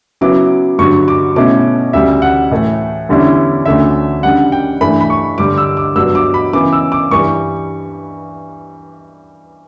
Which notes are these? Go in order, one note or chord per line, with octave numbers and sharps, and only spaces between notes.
C#3 F#3 B3 E4 D6
G2 D3 F#3 C#6
D6
B2 A3 C#4 E4 D6
D2 C#3 G3 E5
F#5
A2 E3 A3
E2 D3 G3 C#4 E4
D2 D3 A3 C#4 E5
C#3 G3 D4 F#5
G5
G2 E3 A3 D4 B5
B5
C#6
G2 D3 G3 D4 D6
E6
D6
G2 F#3 B3 D4 E6
D6
B5
C#3 E3 B3 D6
E6
D6
G2 E3 G3 C#6